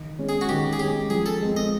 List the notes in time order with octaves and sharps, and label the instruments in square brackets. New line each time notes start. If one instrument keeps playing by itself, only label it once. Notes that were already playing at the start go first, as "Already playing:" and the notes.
Already playing: [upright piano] D#3
G#3 C#4
[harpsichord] G#4
F#4
[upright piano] D#3 [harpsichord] G4
[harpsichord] G#4
[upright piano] G#3 C#4 [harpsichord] G4
[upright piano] F3 [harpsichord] G#4
[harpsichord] A4
[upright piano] G#3 C4
[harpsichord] D#5